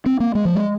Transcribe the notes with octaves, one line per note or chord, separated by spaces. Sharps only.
C4
A#3
G#3
F3
G#3